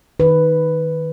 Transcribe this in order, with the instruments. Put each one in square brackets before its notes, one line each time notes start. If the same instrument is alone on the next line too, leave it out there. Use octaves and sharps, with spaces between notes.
[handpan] D#3 B4